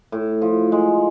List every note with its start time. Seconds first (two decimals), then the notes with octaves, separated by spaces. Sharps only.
0.12 A2
0.42 F3
0.72 G#3